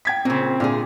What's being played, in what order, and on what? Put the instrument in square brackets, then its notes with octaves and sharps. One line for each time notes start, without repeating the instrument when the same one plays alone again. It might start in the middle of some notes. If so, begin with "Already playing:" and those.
[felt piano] G5 G#6 B6
[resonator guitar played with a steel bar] A#2 C#3 [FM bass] C4
[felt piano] A#2 [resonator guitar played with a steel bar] D3 A3 G#4